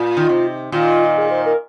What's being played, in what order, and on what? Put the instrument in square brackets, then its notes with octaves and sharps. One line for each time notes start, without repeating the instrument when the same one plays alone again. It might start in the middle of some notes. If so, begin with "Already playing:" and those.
Already playing: [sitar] A#2 [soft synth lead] F4
[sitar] D#3
C3
[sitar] A#2 D#3 [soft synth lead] F4
[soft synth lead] G#4
C5
A#4